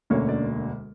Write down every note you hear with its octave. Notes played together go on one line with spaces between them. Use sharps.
E1 D2 D3 A#3 C#4 C#5
D4 D5